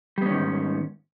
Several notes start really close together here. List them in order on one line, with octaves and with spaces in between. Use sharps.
G3 B3 C#4 D#3 G#2